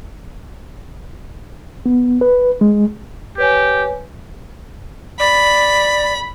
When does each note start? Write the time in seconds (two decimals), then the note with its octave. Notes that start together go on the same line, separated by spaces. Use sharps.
1.86 B3
2.21 B4
2.61 G#3
3.38 G4 B4 C#5 G#5
5.20 D5 B5